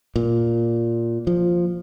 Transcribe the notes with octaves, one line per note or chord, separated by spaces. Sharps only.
A#2
F3